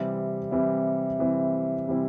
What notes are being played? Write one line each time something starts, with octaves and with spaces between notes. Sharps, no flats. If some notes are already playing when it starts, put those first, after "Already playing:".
Already playing: C3 E3 G3 C4 E4
C3 E3 G3 C4 E4
C3 E3 G3 C4 E4
C3 E3 G3 C4 E4